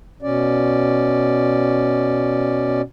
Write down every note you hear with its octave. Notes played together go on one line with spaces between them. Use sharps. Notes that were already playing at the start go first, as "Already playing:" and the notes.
B2 C#4 D5